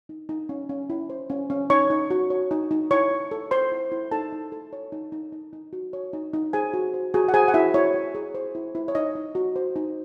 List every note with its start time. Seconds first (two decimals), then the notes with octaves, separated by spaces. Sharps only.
0.09 D#4
0.29 D#4
0.49 C#4
0.69 C#4
0.90 E4
1.10 C5
1.30 C#4
1.50 C#4
1.70 D#4 C#5 C#6
1.90 D#4
2.10 F#4
2.30 C#5
2.51 D#4
2.71 D#4
2.91 E4 C#5 C#6
3.11 E4
3.31 A4
3.51 C5 C6
3.72 E4
3.92 E4
4.11 D#4 A4 A5
4.32 D#4
4.52 A4
4.73 C#5
4.92 D#4
5.12 D#4
5.32 D#4
5.53 D#4
5.73 F#4
5.93 C#5
6.13 D#4
6.33 D#4
6.53 G#4 C5 G#5
6.74 F#4
6.94 C5
7.14 F#4 G#4 G#5
7.28 F#5
7.34 G#4 C5 G#5
7.48 F#5
7.54 E4 F#4 E5
7.74 E4 C#5
7.94 E4
8.15 G#4
8.35 C5
8.55 E4
8.75 E4
8.88 C#5
8.95 D#4 D#5
9.15 D#4
9.35 F#4
9.56 C5
9.76 D#4